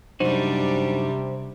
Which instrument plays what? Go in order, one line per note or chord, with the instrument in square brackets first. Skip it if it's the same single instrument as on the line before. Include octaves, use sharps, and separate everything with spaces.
[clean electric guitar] F#2 D#4 F#4 [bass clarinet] C3 [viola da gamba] G3 D4 [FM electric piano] C5